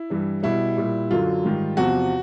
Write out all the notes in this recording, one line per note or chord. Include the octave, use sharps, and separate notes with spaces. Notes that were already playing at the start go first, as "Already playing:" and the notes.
Already playing: E4
G2 E3 G3
B2 G3 E4
A#2 G3
F#2 D3 F#3 F4
G#2 D#3 G3
E2 C3 F3 F#4